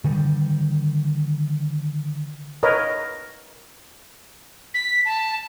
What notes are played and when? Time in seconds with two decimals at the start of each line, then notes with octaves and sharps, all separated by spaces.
0.04 D3 D#3 G3
2.63 A#4 B4 C#5 D#5
4.74 B6
5.05 A5